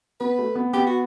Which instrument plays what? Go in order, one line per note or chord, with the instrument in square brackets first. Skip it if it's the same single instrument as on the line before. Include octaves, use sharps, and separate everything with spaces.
[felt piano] B3 [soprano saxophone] B4
[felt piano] A3
B3
[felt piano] B3 [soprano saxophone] G4
[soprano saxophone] F#4